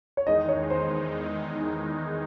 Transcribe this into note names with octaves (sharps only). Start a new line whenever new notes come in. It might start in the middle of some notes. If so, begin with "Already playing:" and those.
C#5
E2 D#3 G#3 D#4 D#5
C#5
C5